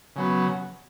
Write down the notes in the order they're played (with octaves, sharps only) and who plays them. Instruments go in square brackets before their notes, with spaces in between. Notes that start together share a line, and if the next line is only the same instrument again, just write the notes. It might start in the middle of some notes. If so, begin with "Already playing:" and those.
[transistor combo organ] C#3 F#3 B3